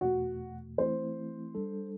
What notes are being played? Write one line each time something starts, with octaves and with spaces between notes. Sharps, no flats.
E2 B2 A3 F#4
E3 A3 C4 E4 C5
G3 D4 A4